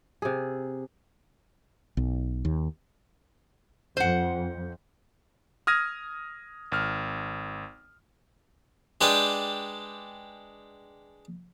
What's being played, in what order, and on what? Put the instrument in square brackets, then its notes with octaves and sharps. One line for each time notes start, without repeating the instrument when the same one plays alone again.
[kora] C3 G#4
[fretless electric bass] B1
D#2
[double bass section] F2 [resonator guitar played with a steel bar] C5 F#5
[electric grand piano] D#6 F6 G#6 A#6 D#7
G#1 F6
[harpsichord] G#3 D4 G4 B4 D5 G5